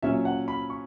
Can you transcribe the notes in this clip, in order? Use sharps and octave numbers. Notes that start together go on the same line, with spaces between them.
A#2 F#3 C#4 E5
F#5
B5
C#6